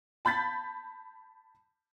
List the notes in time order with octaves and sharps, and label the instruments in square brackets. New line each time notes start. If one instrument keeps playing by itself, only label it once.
[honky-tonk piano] A5 B5 G6 A6 B6